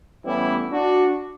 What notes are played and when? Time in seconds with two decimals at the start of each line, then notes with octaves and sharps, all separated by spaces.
0.25 A2 E3 G3 B3 C#4 E4
0.72 D4 F#4